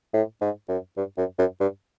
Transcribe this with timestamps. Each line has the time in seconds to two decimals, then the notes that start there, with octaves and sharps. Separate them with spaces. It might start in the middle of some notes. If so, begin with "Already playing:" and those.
0.13 A2
0.41 G#2
0.68 F#2
0.97 G2
1.17 F#2
1.39 F#2
1.60 G2